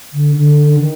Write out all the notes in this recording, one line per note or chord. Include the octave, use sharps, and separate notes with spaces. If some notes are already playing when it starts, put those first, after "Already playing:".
D3
D3
D#3